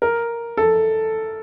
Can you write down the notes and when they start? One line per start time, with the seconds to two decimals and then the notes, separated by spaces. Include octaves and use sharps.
0.02 A#4
0.57 A4